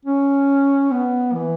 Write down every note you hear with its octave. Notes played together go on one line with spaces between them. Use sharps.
C#4
B3
E3